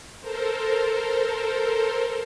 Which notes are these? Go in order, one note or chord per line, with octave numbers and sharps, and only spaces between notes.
A4 A#4 C5